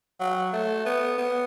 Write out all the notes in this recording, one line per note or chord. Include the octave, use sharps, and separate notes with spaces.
F#3
A3
B3
B3